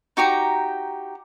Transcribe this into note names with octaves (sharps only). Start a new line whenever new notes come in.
D#4 F#4 G4 A#5